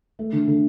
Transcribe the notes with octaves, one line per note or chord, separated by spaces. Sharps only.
A3
D3
D3